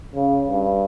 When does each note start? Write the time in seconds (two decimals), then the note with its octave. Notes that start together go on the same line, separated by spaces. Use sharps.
0.15 C#3
0.50 G2